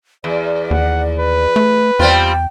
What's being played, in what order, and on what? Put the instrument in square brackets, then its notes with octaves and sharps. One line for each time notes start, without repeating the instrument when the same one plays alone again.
[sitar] E2 [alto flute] D5
[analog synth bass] D#2 [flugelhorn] F#5
[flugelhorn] B4
[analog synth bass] A3
[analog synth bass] E2 [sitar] G3 C4 F4 [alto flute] G5